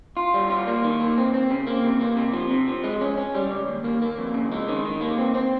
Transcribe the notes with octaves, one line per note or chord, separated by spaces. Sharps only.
F4
G3
F4
A#3
D#3
A#3
C4
C4
C#3
A#3
C3
A#3
C3
F3
C3
F3
G#3
C#4
C#4
G3
C#2
D#2
A#3
A#3
F2
C#3
G#3
D#3
D#3
A#3
C4
C4